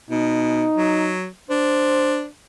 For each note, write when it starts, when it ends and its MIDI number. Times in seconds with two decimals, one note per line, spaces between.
0.10 0.65 47
0.10 1.16 63
0.77 1.27 54
1.50 2.27 62
1.50 2.25 72